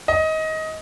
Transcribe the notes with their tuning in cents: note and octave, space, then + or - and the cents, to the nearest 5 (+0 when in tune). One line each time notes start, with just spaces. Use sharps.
D#5 +20